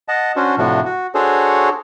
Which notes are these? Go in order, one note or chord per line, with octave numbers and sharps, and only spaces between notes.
D#5 F#5 A5
C#4 D4 F#4 C5
A2 C3 F3 D4 F#4
F#4
D4 F#4 G#4 A4 C5 C#5